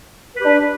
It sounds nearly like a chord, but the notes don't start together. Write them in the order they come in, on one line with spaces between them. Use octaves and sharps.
B4 G4 D4